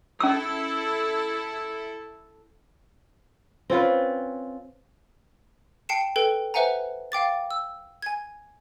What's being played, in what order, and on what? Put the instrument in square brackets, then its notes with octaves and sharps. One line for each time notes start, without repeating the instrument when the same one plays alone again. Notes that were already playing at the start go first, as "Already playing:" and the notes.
[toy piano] C#4 E6 [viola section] E4 A4
[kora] C4 C#4 F4 B4
[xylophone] G5 A5 C7 C#7 E7
A4 B4 G5
B4 C5 E5 F#5 G#5 A#5
F5 G5 D6 A6
E6
G#5 G#6